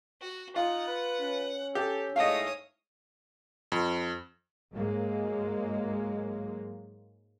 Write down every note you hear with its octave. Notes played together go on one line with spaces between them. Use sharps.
F#4
D#4 F4 F#5
B4
C#4
G4 A4
G#2 A3 E4 G#4 C#5 D#5 F5 D#6
F2
G#2 F#3 G#3 A#3